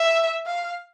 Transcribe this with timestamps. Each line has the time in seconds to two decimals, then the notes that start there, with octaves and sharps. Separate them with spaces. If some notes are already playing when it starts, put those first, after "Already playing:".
Already playing: E5
0.46 F5